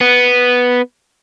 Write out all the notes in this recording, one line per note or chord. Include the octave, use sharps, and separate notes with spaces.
B3